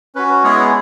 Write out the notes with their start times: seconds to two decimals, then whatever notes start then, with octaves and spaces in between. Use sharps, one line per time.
0.15 C#4 F#4 B4
0.43 G#3 B3 E4 G#4 C#5